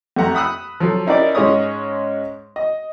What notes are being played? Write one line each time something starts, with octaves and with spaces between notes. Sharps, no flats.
F2 A3 F#5 A#5
B5 D#6 E6 F#6
F3 F#3 A4
C#4 D#4 E4 A#4 D5
G#2 G#3 C#4 C#5 D#6
D#5